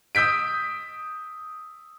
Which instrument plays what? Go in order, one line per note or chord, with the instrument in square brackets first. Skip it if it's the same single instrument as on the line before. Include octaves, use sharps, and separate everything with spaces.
[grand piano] D#6 E6 G6 B6 D7